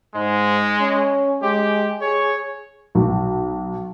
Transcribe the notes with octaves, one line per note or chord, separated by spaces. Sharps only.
G#2 G#3
C#4
G#3 G4
G#4 C#5
B1